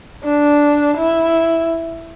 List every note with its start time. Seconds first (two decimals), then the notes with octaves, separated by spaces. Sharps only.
0.23 D4
0.97 E4